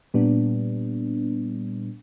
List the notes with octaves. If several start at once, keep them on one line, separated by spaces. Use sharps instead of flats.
A#2 G3 B3 D4